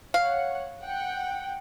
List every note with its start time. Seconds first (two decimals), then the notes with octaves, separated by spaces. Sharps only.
0.14 C#5 F5 F#5
0.82 F#5 G5